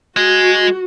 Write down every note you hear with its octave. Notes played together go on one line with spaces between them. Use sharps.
G#3 F#4